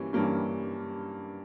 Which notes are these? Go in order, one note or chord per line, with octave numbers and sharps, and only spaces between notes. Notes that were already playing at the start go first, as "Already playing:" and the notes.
Already playing: G2 E3 G3 A#3 C#4
G2 E3 G3 A#3 C#4